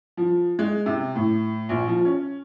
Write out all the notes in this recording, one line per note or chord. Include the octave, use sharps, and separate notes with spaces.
F3
G#3
C3
A2
A#1
F3
C#4